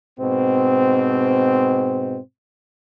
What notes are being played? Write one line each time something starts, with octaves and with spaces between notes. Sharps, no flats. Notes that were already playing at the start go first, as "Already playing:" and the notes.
G#2 B2 C4